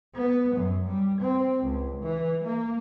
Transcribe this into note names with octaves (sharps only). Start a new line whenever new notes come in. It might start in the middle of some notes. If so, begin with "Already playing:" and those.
B3
F#2
G3
C4
C#2
E3
A#3